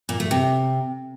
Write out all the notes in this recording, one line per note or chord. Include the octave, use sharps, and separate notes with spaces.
A#2
A3
C3